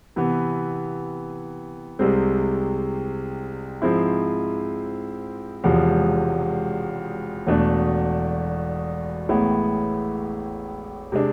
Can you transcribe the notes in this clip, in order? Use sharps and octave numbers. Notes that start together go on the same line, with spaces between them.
C3 E3 B3
C2 C3 G#3 C4
G#2 F3 G#3 C4 E4
E1 E2 C3 F3 G#3
E1 E2 B2 A3 D4
A1 A2 G#3 B3 E4
C3 G#3 D4